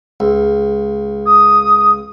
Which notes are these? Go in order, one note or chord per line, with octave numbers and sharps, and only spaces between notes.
C#2
D#6